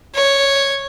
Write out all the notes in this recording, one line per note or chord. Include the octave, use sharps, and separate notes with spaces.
C#5